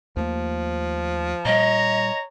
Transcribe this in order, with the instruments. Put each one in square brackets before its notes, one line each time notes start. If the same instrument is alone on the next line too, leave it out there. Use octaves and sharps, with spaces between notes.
[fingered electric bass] D#2 A3 A#3 [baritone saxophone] F3
[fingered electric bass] A#2 G3 [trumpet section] C#5 A#5 [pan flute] D#5